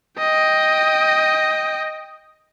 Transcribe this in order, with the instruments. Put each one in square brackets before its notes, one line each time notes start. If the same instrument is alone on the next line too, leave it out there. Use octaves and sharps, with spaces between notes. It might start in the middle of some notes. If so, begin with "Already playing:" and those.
[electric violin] D#5 G5